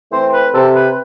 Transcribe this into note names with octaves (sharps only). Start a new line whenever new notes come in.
E3 A3 C4 C5
B4
C3 A4
B4